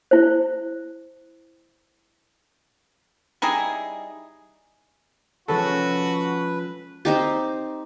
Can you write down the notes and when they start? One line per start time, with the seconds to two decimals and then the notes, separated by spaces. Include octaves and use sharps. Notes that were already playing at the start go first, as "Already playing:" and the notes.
0.11 E4 C5
3.42 G3 D#4 E4 G#4
5.48 F3 G#3 C#4 F#4 A4 B4
7.05 C4 D#4 G4